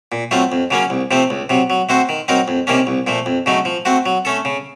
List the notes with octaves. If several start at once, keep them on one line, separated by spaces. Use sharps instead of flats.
A#2
F#3 A3 C4 F4
F2
C#3 F#3 A#3 C#4
C2
C3 F3 A3 C4
C#2
C3 F#3
F#3
A3 C4 F#4 C5
D#3
F#3 C4 D#4 A#4
F2
C3 D#3 A#3 C#4
C2
A#2 F3 A3
F2
C#3 F#3 A3 D#4
F3
A3 C4 F#4
F#3
A3 C#4 A4
C#3